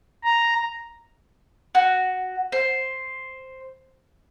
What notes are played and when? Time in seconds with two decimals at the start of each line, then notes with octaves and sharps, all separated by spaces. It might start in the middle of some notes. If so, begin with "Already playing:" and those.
0.24 A#5
1.75 F#4
2.52 C5